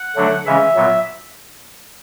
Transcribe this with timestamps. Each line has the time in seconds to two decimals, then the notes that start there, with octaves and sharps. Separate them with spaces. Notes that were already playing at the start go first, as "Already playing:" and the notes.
Already playing: F#5
0.16 D3 F#3 A3 D4
0.46 C#3 E3 G#3 C#4 E5
0.76 A#2 F#3 B3